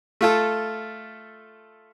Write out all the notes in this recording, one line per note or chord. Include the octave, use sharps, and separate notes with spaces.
A3 F4 A4